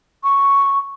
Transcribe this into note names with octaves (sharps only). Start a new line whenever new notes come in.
C#6